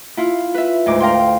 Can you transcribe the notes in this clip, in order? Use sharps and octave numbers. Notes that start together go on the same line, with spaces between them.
E4 F4
B4 E5
D2 G#2 D6
A#4 F5 G5 C6